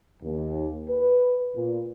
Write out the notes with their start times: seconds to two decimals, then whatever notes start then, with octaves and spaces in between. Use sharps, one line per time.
0.22 D#2
0.89 B4
1.55 A#2